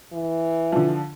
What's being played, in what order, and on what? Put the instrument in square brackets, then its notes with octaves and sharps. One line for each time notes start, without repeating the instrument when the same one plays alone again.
[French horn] E3
[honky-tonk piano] D3 F3